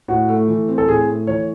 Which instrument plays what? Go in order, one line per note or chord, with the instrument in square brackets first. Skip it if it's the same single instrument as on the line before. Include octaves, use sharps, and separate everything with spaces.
[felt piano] A2 [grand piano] F#4
[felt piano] A3
E3
C4
[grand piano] A4
[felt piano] A2 [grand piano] G#4
[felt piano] A3
[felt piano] E3 [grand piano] C#5